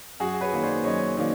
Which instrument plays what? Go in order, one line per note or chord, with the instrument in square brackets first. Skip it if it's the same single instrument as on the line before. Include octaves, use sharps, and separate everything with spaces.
[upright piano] F#2 [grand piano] F#4 G#4
[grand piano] B4 C#5
[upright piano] D#3 F#3 A#3
[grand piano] C5 D5
[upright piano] F#2 [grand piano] C#5 D#5
[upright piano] D#3 F#3 A#3 [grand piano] C5 D5